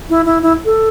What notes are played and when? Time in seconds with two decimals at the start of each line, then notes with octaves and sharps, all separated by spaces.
0.10 E4
0.26 E4
0.43 E4
0.65 A4